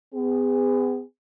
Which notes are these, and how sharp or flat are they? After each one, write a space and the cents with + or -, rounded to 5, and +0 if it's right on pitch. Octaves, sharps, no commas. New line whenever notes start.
B3 +40 G#4 -25